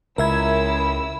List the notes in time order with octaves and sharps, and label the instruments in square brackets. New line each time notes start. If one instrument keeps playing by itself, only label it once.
[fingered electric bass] C#2 [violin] E4 E6 [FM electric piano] A#4 E5 G#6